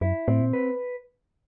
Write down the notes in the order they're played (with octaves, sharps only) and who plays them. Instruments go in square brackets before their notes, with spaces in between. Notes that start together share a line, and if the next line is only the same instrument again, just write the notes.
[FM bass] F#2 [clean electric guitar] E4
[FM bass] A2 [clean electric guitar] C4
[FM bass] A#2
[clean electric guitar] B4